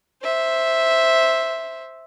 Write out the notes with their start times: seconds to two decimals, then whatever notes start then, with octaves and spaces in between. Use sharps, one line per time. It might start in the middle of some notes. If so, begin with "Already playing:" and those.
0.23 C5 E5